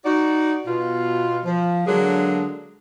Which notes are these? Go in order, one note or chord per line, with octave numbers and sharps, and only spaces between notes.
D#4 F#4 D5
B2 F4
F3
D3 F#3 G#3 A#3 D4 G#4